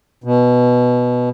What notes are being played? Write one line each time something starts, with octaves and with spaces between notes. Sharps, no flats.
B2